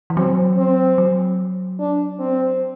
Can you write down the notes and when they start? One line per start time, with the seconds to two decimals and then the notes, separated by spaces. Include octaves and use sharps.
0.10 E3
0.17 F#3 C4
0.57 C4
0.98 F#3
1.79 D4
2.19 C4